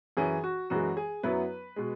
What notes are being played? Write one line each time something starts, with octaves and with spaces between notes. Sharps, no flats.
F#2 E3 C#4 E4 G#4
F#4
F#2 E3 G#3 F#4
G#4
F#2 F#3 B3 E4 B4
B2 G#3